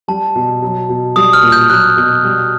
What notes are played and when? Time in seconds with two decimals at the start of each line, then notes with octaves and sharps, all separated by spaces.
0.08 G3 A5
0.36 B2
0.62 F#3
0.89 B2
1.16 G3 D#6
1.33 F6
1.43 A#2
1.52 G6
1.70 F#3 F#6
1.97 B2
2.24 G3